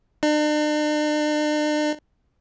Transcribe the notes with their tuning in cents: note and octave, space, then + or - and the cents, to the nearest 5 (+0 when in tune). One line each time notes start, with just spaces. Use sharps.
D4 +45